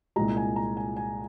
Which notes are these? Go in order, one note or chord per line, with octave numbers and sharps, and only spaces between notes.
C2 A#2 G#3 A#5
G#5
A#5
G#5
G#5